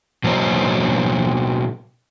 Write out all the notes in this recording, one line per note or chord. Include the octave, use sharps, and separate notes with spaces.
B2 F#3 A#3 C5 C#5 D#5